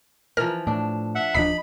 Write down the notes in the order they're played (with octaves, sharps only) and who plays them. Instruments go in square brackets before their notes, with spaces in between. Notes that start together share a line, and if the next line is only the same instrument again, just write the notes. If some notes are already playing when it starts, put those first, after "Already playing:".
[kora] E3 F3 [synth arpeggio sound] A#4 F6
[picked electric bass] A2 [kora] D4
[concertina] E5 F#5
[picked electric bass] D1 F3 D4 [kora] D#4 [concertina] B5 [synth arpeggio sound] B6